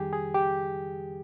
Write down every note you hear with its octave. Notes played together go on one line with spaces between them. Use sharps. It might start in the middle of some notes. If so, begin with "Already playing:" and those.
Already playing: F2 D#3 G3 G4 G#4
G#4
G4